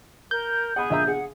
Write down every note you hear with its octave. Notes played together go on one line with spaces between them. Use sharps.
A#4 G6
G#4 F#5 B5
A#1 E5 A#5
G#4 F#5